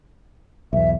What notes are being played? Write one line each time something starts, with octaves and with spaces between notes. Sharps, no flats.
B1 E2 E5